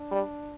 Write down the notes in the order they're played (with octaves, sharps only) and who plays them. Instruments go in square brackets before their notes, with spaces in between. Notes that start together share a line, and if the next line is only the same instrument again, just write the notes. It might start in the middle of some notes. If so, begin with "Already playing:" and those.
Already playing: [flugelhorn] D4
[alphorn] G3